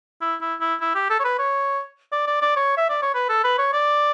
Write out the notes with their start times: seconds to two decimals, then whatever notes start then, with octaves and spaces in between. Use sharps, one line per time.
0.22 E4
0.41 E4
0.61 E4
0.81 E4
0.95 G4
1.10 A4
1.20 C#5
1.24 B4
1.39 C#5
2.12 D5
2.27 D5
2.42 D5
2.57 C#5
2.77 E5
2.89 D5
3.02 C#5
3.14 B4
3.29 A4
3.44 B4
3.58 C#5
3.73 D5